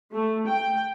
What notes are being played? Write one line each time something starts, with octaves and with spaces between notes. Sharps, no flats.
A3
G5